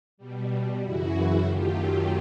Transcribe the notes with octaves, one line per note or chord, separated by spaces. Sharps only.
B2 G3
F#2 C#3 E3 E4 F#4
F#2 D#3 F#3 A3 F4 G4